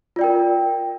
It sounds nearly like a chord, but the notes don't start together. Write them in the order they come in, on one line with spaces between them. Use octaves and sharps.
F4 D5 G5 A#4